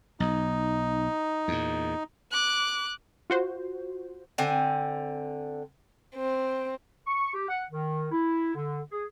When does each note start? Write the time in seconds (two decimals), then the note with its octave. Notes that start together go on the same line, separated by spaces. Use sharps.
0.20 B1 D#4
1.48 E2 A#2
2.31 D6 F#6
3.30 F4 F#4 C5
4.38 D3 C4 G#5
6.15 C4
7.07 C#6
7.34 G4
7.49 F#5
7.71 D#3
8.11 E4
8.55 D3
8.92 G#4